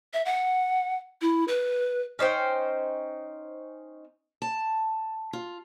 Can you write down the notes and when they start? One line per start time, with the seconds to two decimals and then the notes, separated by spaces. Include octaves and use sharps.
0.13 E5
0.25 F#5
1.21 E4
1.48 B4
2.19 C#4 D#4 C5 G5
4.42 A5
5.33 F4